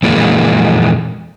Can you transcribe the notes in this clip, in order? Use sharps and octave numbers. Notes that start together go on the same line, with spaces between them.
F2 A#2 E3 G#3 A#3